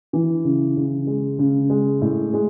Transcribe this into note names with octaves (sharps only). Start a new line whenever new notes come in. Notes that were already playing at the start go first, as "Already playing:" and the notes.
E3
C#3
C#3
G#3
C#3
G#3
A2
G#3